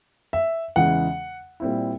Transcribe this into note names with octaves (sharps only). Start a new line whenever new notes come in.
E5
E2 C#3 E3 G#3 F#5
A#2 G3 C4 E4